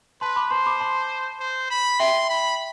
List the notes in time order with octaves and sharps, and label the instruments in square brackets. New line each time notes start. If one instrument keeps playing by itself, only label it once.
[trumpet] B4 [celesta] A5 C6
[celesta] B5 D6
[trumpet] C5 [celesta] A5 C6
[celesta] B5 D6
A5 C6
[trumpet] C5
B5
[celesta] E5 G5 [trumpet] C6
[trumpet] B5